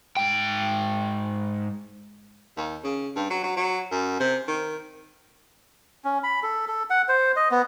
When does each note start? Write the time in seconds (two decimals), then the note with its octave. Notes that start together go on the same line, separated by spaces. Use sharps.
0.17 G#2 G5
2.57 D#2
2.84 C#3
3.16 G2
3.30 F#3
3.43 F#3
3.57 F#3
3.91 F#2
4.20 C3
4.48 D#3
6.04 C#4
6.23 B5
6.43 A4
6.68 A4
6.90 F#5
7.08 C5
7.36 D#5
7.51 B3